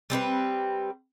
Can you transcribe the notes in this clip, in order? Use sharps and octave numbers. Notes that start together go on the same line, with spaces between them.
G3 C4 D#4 B4